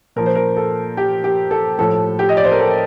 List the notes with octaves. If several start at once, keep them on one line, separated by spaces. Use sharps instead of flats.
A#2 F3 A#4
C5
A#4
A4
G4
G4
A4
A2 F3 A4
G4
D#5
D5
C5
A#4
A4